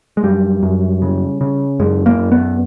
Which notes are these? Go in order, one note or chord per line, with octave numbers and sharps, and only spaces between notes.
G#3
F#2 G3
F#2
C#3
C#3
F#2 G#3
A#3
F#2
B3